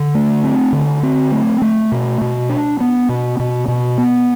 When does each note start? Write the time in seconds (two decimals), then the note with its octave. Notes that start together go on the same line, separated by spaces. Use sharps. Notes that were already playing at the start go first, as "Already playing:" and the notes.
Already playing: D3
0.15 A3
0.44 C4
0.73 D3
1.03 C4
1.32 A3
1.62 A3
1.92 B2
2.21 B2
2.50 D4
2.80 B3
3.09 B2
3.39 B2
3.68 B2
3.98 B3